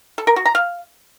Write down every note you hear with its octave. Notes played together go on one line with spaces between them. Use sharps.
A4
A#4
F#4
A#5
F5